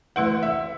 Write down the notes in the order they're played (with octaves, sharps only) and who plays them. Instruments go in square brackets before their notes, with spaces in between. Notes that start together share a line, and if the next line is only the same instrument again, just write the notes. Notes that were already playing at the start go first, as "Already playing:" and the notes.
[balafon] E3 A3 E4 B4 [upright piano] F#5
[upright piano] E5